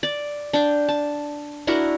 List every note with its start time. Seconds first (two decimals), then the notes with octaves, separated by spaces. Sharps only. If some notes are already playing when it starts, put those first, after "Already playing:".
0.03 D5
0.53 D4 G5
0.89 A5
1.67 D4 E4 F#4 A#4